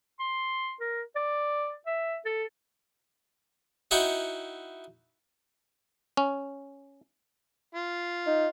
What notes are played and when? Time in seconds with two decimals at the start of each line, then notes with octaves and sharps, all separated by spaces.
0.20 C6
0.81 A#4
1.16 D5
1.87 E5
2.26 A4
3.91 D#4 E4 F#4 G5 C#6
6.17 C#4
7.75 F4
8.26 D#4